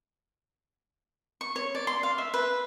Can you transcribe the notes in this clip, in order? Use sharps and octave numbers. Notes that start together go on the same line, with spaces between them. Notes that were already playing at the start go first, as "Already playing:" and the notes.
C#6
C#5
D5
C6
F5
E5
B4